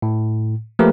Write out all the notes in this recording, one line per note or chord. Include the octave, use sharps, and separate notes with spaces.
A2
F3 A3 A#3 G4 A#4 B4